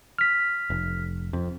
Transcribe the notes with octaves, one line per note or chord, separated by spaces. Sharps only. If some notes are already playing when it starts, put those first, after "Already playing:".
F6 B6
F1
F2